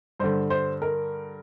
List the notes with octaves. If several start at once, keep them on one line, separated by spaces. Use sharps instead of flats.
G2 D3 C5
C5
A#4